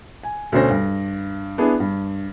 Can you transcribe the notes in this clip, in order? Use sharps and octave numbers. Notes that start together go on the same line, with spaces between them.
G#5
D2 B2 C#4 C5 A#6
G2
B3 D4 E4 G#4
G2